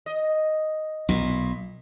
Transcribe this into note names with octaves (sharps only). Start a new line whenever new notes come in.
D#5
B1 A#2